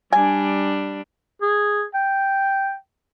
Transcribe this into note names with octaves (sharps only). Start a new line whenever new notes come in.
G3 D4 G#5
G#4
G5